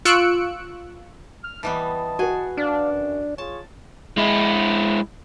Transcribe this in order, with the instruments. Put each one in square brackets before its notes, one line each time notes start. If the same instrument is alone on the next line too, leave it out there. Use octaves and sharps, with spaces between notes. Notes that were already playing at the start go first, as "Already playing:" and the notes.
[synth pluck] F4 C#6 E6 F#6 C#7 D7
[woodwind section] F6
[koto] E3 G3 B3 [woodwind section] D#5 A5
[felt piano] F#4 B4 [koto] G#4 G#5
[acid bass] D4 [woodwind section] D5 F5
[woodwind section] F#2
[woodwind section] F4 G#4 C#5 [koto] A5
[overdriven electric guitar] G#3 E4